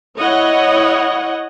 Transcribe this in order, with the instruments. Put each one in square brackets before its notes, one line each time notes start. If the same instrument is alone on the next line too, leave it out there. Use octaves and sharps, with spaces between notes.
[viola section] E4 C#5 D#5 F#5